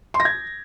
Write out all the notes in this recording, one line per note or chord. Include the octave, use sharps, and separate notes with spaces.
C6
A#6
G#6